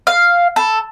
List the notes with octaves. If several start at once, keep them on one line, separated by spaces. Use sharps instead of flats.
F5
A4